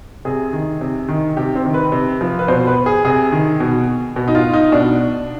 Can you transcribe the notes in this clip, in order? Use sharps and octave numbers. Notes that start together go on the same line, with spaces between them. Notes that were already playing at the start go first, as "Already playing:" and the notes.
C3 G#4
D#3
C3
D#3
C3 G4
C4
D#3
B4
C3
F3
B4
B2 C5
B4
G#4
C3 G#4
D#3
B2
B2
D#4
F4
D#4
B2 D4